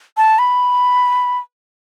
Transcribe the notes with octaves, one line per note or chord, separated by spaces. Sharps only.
A5
B5